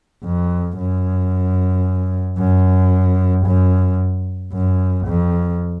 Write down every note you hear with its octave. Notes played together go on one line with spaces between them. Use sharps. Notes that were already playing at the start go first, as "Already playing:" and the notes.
F2
F#2
F#2
F#2
F#2
F2